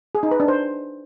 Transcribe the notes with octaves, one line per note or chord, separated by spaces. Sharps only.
G#4
D#4
B4
D4
C5